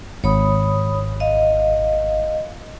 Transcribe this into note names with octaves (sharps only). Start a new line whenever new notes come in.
G#1 C#5 B5 D#6
D#5 F5